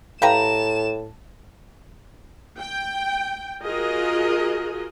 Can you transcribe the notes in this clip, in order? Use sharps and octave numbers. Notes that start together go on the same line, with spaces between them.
A2 G4 B4 F5 G5 A5 A#5 E7
G5
F4 F#4 G#4 A#4 D#5